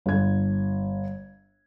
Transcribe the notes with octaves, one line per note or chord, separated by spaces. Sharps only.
G1 G#6